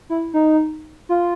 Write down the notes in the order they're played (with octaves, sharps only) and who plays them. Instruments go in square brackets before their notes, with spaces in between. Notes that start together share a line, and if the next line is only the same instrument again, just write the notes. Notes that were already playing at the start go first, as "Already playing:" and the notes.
[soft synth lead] E4
D#4
F4